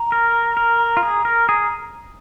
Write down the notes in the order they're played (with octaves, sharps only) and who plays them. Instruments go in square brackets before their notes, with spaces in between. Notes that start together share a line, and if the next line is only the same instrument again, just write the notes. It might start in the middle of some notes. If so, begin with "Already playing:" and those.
Already playing: [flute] A#5
[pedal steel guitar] A#4
A#4
F4
G#4
A#4
G#4